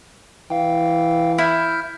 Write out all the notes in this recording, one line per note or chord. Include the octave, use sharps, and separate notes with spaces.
E3 F5 G5
E4 F6 G6